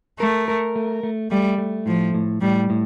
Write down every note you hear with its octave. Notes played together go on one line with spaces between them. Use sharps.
A3 A#4
A#4
A3
A3
G3 A3
A3
A2 F3
A2
A2 G3
A2